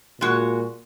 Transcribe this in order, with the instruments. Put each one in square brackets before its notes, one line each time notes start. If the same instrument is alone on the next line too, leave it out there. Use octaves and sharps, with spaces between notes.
[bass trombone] A#2 [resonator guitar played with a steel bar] G#3 F#4